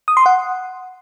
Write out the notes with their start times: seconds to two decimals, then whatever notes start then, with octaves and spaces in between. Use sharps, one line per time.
0.08 D#6
0.17 C6
0.26 F#5